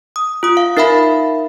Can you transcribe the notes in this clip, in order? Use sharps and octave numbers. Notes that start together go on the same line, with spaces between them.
D#6
F4 D#6
F5
D#4 A#4 E5 F5 B5